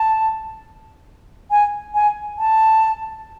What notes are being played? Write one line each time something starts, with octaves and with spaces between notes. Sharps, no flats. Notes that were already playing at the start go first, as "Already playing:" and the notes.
Already playing: A5
G#5
G#5
A5